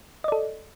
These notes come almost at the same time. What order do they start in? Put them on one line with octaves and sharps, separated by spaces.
D#5 D5 A4